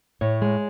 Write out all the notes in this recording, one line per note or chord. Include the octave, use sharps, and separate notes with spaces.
A2 C#5
G#3